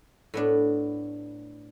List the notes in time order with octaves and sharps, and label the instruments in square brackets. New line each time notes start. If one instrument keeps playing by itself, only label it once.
[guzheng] A2 B3 D4